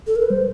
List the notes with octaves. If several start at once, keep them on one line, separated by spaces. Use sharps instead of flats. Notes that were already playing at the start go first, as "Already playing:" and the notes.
A4
A#4
B4
G3 C5